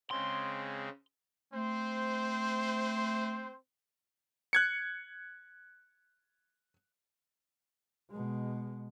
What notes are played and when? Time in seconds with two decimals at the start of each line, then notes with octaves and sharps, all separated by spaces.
0.11 C#3 G#3 C4 C6
1.53 A3 C4 C5
4.53 F#6 G#6 C#7
8.11 B2 G#3